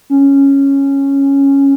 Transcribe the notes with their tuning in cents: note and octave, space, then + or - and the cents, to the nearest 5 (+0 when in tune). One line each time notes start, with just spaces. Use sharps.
C#4 -5